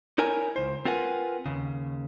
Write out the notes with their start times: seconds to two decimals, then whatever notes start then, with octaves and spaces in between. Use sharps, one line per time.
0.18 D#4 E4 A#4 C#5 G#5 A#5
0.56 C#2 C5
0.85 C4 F4 A#4 B4 F#5 G#5
1.46 D#2 C#3